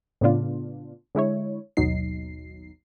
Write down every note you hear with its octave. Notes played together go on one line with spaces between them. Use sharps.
A2 C#3 B3 D4 F4
D3 G#3 E4 C#5
G#1 D#2 B2 F#3 D#4 C7